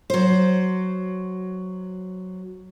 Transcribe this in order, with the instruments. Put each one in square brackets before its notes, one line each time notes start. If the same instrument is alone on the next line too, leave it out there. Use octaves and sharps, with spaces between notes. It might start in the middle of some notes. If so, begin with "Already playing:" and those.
[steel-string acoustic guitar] F#3 C5